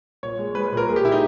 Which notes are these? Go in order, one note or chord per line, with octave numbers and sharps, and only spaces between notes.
A#2 C#5
G#3
G#3 B4
B4
A#2
A#4
A#2 G#4
G4
A#2 E4
D#4